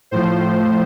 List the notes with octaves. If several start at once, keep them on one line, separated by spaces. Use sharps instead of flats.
A2 F3 C5